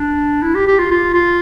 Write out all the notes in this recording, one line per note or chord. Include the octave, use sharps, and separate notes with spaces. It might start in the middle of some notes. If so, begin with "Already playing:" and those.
Already playing: D4
E4
G4
G4
F4
F4
F4